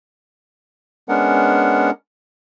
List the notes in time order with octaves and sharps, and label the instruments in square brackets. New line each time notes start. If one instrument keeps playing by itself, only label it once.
[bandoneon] G#3 B3 C#4 D4 A#4 F#5